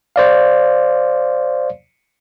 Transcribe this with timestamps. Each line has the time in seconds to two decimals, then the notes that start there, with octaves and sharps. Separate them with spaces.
0.16 C5 D5 F5